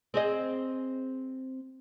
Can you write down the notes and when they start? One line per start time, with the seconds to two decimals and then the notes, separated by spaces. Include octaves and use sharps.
0.14 C4 G#4 D#5